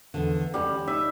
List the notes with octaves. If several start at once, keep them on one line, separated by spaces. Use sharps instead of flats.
E2 D3
G3 G#3 C#4
D#4 E5